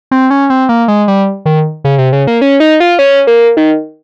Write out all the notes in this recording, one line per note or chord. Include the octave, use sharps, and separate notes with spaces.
C4
C#4
C4
A#3
G#3
G3
D#3
C#3
C3
C#3
A#3
C#4
D#4
F4
C#4
A#3
D#3